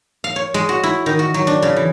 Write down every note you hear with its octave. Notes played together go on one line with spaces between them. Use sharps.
F5
C#5
G#3
F#4
E4
D#3
F#4
F#3
D4
C#3
E3